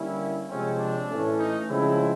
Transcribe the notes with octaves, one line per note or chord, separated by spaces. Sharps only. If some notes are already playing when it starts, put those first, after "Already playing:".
Already playing: D3 G3 A#3 C#4 E4
C3 F3 G#3 C4 C#4
D4
A2 E3 A3 C#4
D#4
C#3 F3 G#3 C4 E4